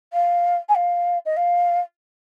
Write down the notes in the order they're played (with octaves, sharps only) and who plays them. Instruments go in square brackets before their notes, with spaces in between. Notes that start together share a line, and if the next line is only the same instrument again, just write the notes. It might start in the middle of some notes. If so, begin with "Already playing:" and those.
[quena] F5
G#5
F5
D#5
F5